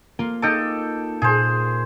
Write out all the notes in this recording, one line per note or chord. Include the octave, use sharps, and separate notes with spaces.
A#3 F4
D#4 A4 D#5 G5 D6
A#2 G#4 C5